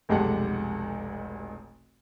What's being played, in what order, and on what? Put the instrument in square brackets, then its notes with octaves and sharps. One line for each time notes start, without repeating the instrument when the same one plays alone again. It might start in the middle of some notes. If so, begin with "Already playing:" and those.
[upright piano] F1 B1 G#3 G4 A4 F#5